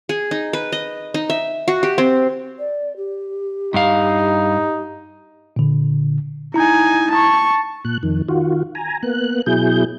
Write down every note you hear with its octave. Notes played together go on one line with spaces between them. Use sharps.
G#4
D#4
B4
D#5
D#4
E5
F#4
G4
C4
D5
G4
G2 D#4 F5
A#2 D3
D#4 E4 G#5 A#5
A5 C#6
A#2 F#6
F2 D#3
D#3 F4 F#4
G#5 A#5
A#3 B3 F#6
B2 F#3 E4 G#4 G6